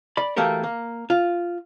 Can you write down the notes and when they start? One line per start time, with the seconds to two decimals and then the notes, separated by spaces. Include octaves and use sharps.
0.17 D5 B5
0.36 E3 A3 A#3 F#4 G4 A#4
0.64 A#3
1.10 F4